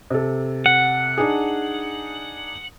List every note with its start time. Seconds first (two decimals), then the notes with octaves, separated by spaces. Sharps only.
0.10 C3 A4
0.66 F#5
1.18 D4 D#4 G#4